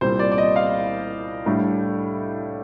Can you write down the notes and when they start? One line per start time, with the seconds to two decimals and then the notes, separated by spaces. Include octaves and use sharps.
0.01 C2 A#2 G3 C4 C5
0.19 D5
0.32 D5
0.38 D#5
0.56 F5
1.46 A2 G3 D4